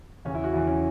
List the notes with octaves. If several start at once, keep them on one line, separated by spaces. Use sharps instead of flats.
E2 C#3 E3 C#4
E4
F#4
E2 C#3 E3 E4
C#4